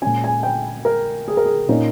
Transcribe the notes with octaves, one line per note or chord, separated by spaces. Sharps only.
A#2 G#3 C#4 G#5
G#5
G5
A#4
G#4
A#4
G#4
A#2 A#3 C#4 D#4